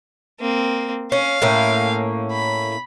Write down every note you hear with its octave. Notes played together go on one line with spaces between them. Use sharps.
A#3 C4
C#4 F5
A2 A#3 C#4
B5